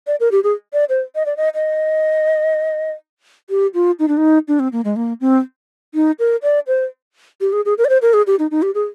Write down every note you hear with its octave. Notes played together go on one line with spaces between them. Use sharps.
D5
A#4
G4
G#4
D5
C5
D#5
D5
D#5
D#5
G4
F4
D#4
D4
D#4
D4
C4
A#3
G#3
A#3
C4
D#4
A#4
D5
C5
G4
G#4
G#4
A#4
D5
C5
A#4
G#4
G4
D#4
D#4
G4
G#4